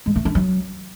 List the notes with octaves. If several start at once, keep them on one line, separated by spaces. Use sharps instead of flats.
G#3
A3
D4
F#3